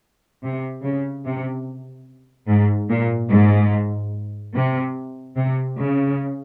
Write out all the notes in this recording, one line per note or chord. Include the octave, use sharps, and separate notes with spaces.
C3
C#3
C3
G#2
A#2
G#2
C3
C3
C#3